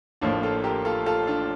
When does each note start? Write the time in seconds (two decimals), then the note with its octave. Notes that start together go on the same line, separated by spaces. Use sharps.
0.21 A1 A2 F3 A#3 D4
0.43 F4 A4
0.64 G4 A#4
0.85 F4 A4
1.06 F4 A4
1.27 D4 F4